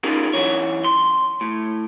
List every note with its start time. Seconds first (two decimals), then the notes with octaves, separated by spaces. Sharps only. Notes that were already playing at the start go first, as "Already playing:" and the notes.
0.03 C#4 D#4 F4 G#4 A#4
0.34 F#2 E3 C#5
0.84 C6
1.41 A2